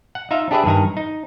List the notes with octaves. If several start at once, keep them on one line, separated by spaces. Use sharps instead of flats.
F#5
D#4 F4 E5 F5
D4 G4 G#4 B4 D5 E5
G2 D#3 G#5 A#5
D#4